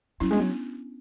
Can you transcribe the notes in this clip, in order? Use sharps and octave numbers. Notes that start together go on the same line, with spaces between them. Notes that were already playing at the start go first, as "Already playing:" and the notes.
F#3 C#4 E4
G#3 B3 D4
F#3